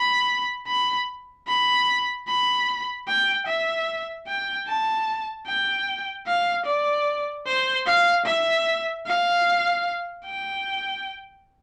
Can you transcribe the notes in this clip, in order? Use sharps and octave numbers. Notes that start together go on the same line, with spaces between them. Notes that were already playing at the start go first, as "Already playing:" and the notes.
Already playing: B5
B5
B5
B5
G5
E5
G5
A5
G5
F5
D5
C5
F5
E5
F5
G5